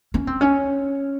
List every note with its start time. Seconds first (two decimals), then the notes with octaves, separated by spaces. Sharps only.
0.14 C#4
0.27 C4
0.41 C#4